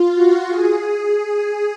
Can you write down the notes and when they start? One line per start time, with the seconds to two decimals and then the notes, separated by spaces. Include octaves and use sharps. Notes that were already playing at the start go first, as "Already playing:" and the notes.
Already playing: F4
0.14 F#4
0.49 G#4